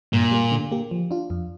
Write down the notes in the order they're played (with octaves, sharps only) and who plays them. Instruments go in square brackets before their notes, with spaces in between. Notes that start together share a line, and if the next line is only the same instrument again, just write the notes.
[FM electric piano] G2 [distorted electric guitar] A#2
[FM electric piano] G3 A#3
D3
A#3 G4
F3
D4 F4
F2